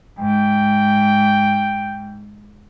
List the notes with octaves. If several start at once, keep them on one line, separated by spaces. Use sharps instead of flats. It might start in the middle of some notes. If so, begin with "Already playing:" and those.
G#2 G5